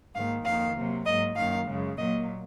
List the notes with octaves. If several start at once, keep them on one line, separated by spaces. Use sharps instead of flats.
G#2 D#3 A#3 F5
F2 D#3 A#3 F5
C3 F#3 A#3
G#2 F#3 A#3 D#5
F#2 D#3 A#3 F5
F#2 C#3 G#3
A#2 F#3 A#3 D#5